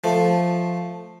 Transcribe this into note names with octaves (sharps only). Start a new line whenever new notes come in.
F3 A3